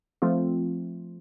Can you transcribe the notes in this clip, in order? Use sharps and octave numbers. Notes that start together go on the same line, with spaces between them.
F3 A3 C4 F4